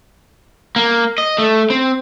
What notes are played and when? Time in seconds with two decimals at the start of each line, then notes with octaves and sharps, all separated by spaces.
0.76 A#3
1.18 D#5
1.39 A3
1.70 C4